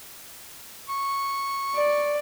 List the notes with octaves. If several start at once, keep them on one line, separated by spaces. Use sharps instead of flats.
C#6
D5